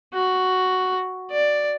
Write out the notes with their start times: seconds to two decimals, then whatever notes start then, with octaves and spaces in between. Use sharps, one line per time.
0.14 F#4
1.31 D5